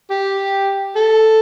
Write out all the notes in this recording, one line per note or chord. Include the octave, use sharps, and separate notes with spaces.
G4
A4